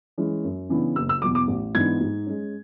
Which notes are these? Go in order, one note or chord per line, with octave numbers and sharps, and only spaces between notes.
E3 G#3 C#4
F#2
C#3 E3 B3 D4
F#1 E6
E6
E2 B2 F#3 D6
D6
A1
G#2 E3 B3 D4 G#6
G#2
G#3 C#4